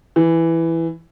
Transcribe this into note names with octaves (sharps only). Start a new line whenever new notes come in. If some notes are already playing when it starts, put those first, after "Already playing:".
E3